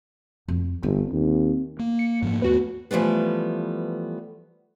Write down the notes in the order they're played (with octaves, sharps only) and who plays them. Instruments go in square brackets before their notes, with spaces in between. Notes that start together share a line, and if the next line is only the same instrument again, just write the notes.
[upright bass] F2
[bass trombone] G1 [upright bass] C4
[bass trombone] D#2
[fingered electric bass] A#3
[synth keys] C#7
[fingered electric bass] G#2 F3 A#3
[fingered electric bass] D#2 A3 B3 [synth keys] F#4 B4
[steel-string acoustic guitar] E3 F3 G3 A3 B3